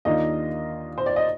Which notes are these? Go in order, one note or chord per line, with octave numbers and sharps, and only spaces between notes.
D#2 D#3 A#3 D4 F4 D#5
C5
D5
D#5